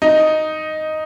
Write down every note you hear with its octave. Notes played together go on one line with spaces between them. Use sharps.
D#4